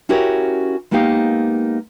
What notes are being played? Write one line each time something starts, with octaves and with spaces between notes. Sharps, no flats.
C#4 E4 F#4 G4 A#4 C#5
G#3 A#3 B3 D#4 G4 F5